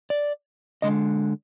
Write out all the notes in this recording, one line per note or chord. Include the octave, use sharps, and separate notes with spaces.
D5
D3 G#3 D#5